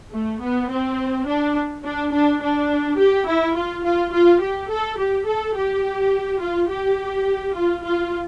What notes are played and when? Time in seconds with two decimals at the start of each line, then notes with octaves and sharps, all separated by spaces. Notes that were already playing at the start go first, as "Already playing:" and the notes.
0.12 A3
0.42 B3
0.70 C4
1.27 D4
1.84 D4
2.12 D4
2.42 D4
2.98 G4
3.26 E4
3.55 F4
3.84 F4
4.12 F4
4.41 G4
4.70 A4
4.97 G4
5.26 A4
5.56 G4
6.41 F4
6.70 G4
7.55 F4
7.84 F4